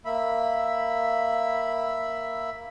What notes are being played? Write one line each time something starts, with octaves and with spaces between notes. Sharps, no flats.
A#3 E5 B5